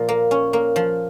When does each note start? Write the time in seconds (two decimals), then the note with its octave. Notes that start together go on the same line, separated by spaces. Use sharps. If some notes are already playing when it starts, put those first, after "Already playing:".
Already playing: A#2 F3
0.09 A#3
0.31 C#4
0.53 A#3
0.76 F3